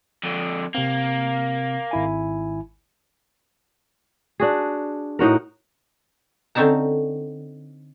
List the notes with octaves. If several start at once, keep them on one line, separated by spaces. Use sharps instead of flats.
F2 D3
C3 A#3 C4
G#1 E4 G#5
D4 F#4 G#4
A2 D#4 F#4 A#4
D3 C4 C#4 D#4 A5 A#5